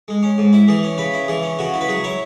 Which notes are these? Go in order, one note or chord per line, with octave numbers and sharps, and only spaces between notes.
G#3
C#4
G#2
E4
E3 G#4
C#4
C#3 B4
E4
E3 G#4
C#4
C#3 F#4
E4
B4
F#3 G#4
E4 C#5